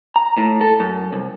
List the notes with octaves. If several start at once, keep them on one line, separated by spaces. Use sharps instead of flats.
A#5
A2
A4
F#2
C2